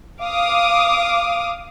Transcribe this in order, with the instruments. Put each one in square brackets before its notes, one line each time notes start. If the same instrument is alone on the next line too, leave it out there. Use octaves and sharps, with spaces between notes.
[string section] F5 D6 D#6